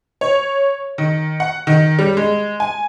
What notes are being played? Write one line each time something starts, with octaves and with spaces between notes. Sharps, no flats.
C#5
D#3
F#5
D#3
G3
G#3
G#5